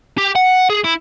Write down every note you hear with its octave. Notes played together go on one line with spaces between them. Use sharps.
G4
F#5
G#4
E4